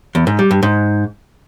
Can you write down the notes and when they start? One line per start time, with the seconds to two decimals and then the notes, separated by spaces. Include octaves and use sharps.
0.15 E2
0.27 G#2
0.39 G3
0.51 G2
0.63 G#2